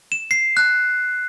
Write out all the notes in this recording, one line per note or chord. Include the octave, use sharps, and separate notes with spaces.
E7
C7
F#6